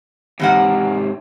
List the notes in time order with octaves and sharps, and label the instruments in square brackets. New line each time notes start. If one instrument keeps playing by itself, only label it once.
[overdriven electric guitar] G#2 C3 [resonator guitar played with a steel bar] E3 A#3 F#5